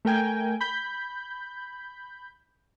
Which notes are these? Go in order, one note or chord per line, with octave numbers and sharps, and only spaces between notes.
A3 A#4 G5 G#5
B5 G6